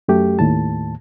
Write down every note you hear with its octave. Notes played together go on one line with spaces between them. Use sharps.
F#2 A3 G4
D#2 A2 A5